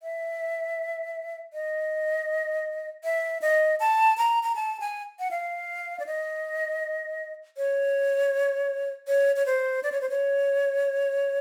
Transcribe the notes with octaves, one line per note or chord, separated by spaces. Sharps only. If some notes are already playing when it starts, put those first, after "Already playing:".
E5
D#5
E5
D#5
A5
A#5
A#5
A5
G#5
F#5
F5
D5
D#5
C#5
C#5
C#5
C5
D5
C#5
C5
C#5